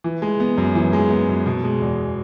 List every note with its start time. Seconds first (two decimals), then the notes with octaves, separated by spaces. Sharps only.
0.04 E3
0.22 G#3
0.40 B3
0.58 F#2
0.75 E3
0.93 G#3
1.11 B3
1.29 F#2
1.46 B2
1.64 G#3
1.82 E2